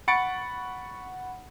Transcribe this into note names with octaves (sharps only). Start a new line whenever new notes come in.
F#5 B5 C#6 A6 C#7 D7